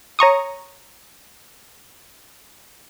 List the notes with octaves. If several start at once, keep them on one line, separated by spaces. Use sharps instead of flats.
C#5 A#5 C#6 D#6